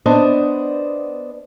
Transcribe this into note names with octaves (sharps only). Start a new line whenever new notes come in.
B3 D4 C5 D#5